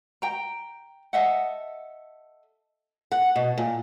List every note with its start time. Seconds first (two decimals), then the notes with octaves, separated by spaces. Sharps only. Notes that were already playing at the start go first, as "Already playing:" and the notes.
0.22 G5 A#5
1.13 A4 D#5 E5 F#5
3.12 F#5
3.36 B2
3.58 A#2